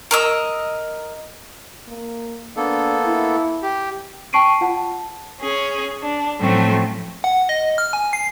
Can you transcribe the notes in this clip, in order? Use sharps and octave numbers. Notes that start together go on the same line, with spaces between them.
A#4 D#5 E6
A#3
A#3 B3 D4 A4
E4
G4
G5 A5 C#6 C7 D7 D#7
F4 F#5 A5
C#4 G#4
D4
A2 F3 F#3 A3 C4 C#4
F#5
D#5
F6
G#5
C7